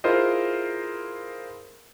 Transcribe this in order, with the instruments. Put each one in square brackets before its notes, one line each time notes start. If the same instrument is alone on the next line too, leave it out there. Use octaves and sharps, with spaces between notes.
[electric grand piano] E4 F4 G#4 A#4 C5 D#5